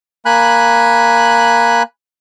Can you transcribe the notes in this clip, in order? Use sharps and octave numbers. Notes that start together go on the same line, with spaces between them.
A#3 G#5 B5 F#6